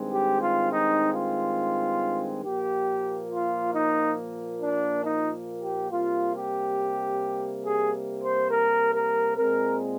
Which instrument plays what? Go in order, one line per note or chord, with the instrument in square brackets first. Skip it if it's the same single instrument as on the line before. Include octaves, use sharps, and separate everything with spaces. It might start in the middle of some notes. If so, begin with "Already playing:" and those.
Already playing: [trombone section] G2 D#3 G#3 C4
G4
F4
D#4
F4
A#2 F3 A#3 G4
F4
D#4
D4
D#4
G4
C3 G3 A#3 F4
G4
G#4
C5
A#4
A#4
A#2 G#3 C4 A#4